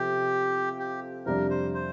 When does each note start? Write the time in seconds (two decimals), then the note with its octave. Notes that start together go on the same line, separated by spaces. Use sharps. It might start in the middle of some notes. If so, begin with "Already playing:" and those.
Already playing: C3 F3 C4 F4 G4 A4
0.79 G4
1.26 F2 C3 G3 D4 A#4
1.50 C5
1.74 C5